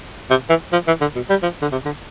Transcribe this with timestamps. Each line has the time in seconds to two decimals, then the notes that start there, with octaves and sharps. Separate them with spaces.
0.30 C3
0.49 E3
0.72 F3
0.87 E3
1.01 D3
1.15 B2
1.30 G3
1.43 F3
1.62 D3
1.72 C3
1.85 D3